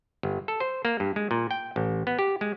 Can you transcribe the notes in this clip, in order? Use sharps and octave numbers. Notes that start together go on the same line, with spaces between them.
G1
A4
C5
A#3
G2
G#3
A#2
G5
A1
B3
G4
G#3